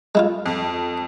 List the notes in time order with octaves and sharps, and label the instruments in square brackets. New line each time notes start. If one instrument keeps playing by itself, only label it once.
[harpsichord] G#3 E4 F4
[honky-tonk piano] F2